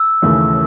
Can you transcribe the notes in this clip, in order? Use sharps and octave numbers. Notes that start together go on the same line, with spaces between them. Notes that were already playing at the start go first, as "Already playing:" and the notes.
Already playing: E6
D#2 C#3 E3 A3 C#4